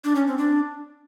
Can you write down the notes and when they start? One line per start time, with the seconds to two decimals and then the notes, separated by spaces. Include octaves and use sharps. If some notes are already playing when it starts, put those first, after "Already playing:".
0.04 D4
0.16 C#4
0.27 C4
0.38 D4